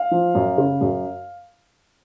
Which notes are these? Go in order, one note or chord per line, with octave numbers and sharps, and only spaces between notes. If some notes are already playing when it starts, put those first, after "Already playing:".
Already playing: F5
F3
F#2
C#3
F#2